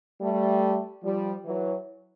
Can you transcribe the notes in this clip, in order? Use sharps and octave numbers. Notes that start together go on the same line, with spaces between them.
G3 A3
F3 G3
E3 F#3